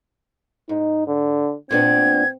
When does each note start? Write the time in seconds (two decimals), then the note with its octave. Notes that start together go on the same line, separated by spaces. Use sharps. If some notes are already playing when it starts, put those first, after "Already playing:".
0.69 G#2 D#4
1.07 D3
1.71 A#2 B3 C4 D4 G#6